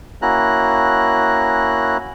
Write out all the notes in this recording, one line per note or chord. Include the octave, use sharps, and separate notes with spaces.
A#3 C#4 E4 F#4 A#5 F#6